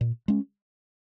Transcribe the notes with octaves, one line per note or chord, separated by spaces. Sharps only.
A#2
G#3 C#4